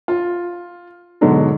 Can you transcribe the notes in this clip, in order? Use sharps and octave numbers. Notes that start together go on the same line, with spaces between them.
F4
G#2 B2 D3 F#3 G#3